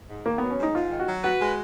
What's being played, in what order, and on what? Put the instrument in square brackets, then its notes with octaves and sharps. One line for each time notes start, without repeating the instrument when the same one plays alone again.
[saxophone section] G#2
[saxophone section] D#3 [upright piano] A#3
[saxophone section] F#3 [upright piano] B3
[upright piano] C#4
[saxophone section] G#2 [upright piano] D#4
[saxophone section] G#2 [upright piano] F4
[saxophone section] D#3
[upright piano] F#4
[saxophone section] F#3
[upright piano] F#4 [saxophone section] B4
[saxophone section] G#3